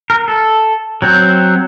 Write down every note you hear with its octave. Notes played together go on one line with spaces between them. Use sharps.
A#4
A4
F#3 C4